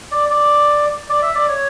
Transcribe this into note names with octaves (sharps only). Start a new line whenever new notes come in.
D5
D5
D5
E5
D5
C#5